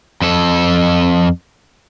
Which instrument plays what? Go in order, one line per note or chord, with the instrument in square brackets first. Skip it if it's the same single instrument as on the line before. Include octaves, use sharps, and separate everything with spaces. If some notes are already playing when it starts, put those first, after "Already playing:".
[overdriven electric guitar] F2 A4